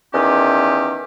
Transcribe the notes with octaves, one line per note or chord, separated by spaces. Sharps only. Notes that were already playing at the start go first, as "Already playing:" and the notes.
E2 D#3 C#4 G4